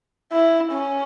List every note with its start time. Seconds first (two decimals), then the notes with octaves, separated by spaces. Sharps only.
0.32 E4
0.72 C#4